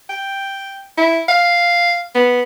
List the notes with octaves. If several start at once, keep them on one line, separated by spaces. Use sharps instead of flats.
G5
E4
F5
B3